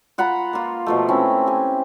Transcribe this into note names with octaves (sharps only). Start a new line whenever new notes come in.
F4 F#5 A#5 B5
A#3 F4
B2 F3 A3
C4 C#4 E4
G4 G#5